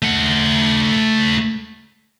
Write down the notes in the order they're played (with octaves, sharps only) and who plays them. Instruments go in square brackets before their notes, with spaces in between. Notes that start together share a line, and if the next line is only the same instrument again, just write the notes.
[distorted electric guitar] A3 F#5